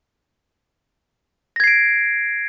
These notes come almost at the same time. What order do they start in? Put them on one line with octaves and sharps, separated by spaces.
A#6 G#6 C7 D7